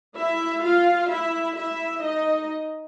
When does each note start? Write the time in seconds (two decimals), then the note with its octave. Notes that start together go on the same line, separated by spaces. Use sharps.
0.16 E4 E5
0.62 F4 F5
1.10 E4 E5
1.56 E4 E5
2.04 D#4 D#5